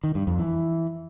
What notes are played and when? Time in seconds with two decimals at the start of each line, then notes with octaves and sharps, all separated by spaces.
0.04 D#3
0.15 G2
0.27 F2
0.39 E3